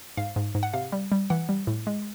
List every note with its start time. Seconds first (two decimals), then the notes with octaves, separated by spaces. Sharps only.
0.17 G#2 F5
0.36 G#2
0.55 G#2
0.63 F#5
0.73 C3 F5
0.92 G3
1.12 G3
1.30 E3 F#5
1.49 G3
1.67 A2
1.87 G#3